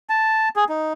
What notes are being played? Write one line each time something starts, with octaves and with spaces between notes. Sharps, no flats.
A5
G#4
D#4